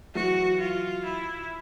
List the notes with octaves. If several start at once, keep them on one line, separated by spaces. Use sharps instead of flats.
E3 F#3 F#4
F4
E4